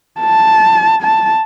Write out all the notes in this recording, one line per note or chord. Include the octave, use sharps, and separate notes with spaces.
A5
A5